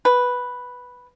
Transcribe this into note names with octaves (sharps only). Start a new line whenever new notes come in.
B4